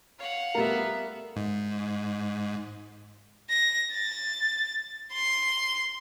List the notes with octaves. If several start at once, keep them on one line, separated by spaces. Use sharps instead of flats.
C#5 F5 F#5
G3 A3 B3 A#4 E5
G#2
A#6
A6
C6